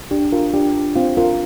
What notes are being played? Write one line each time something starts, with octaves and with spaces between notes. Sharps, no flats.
D4 G4
F4 A#4
D4 G4
C4 F4
F4 A#4